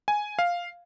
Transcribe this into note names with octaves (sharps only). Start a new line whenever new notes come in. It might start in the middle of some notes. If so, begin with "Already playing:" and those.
G#5
F5